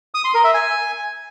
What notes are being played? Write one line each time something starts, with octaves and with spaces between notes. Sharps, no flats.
D#6
C6
A#4
E5
G#5